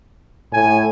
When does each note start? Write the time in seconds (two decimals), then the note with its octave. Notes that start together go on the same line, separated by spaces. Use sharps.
0.53 A2 G#5